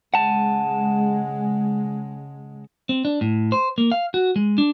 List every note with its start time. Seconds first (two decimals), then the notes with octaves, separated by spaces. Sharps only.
0.14 C#3 G#3 F#5 A5
2.89 C4
3.05 D4
3.21 A2
3.52 C5
3.78 A#3
3.92 F5
4.14 F#4
4.36 G#3
4.58 D4